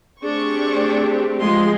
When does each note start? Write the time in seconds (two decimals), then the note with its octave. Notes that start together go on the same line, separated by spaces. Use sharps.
0.24 A3 C4 D4 G4 G#4 C#6
1.40 F3 G#3 F4 C6